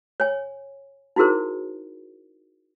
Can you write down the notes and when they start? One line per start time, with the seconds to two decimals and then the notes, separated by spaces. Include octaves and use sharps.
0.20 C#5 G#5
1.16 D#4 E4 F#4 G#4 A#4 C5